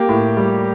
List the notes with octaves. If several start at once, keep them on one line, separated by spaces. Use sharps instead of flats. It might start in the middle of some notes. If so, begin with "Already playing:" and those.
Already playing: A#3 G4
A2
G3